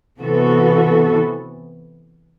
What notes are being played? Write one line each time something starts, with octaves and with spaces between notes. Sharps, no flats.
C3 E3 B3 F#4 A4